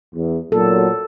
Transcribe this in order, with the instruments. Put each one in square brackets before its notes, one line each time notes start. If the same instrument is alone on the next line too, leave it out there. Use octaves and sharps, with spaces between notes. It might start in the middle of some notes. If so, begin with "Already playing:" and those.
[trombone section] E2
[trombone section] B1 A#2 F#3 [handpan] A4